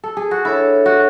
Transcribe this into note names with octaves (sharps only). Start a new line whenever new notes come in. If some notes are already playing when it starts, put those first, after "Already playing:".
A4
G#4
F#4
D4 E4 A4 C#5 E5
F#4